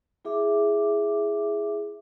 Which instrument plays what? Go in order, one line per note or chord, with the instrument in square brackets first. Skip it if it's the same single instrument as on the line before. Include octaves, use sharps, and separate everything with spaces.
[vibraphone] E4 G#4 E5 D6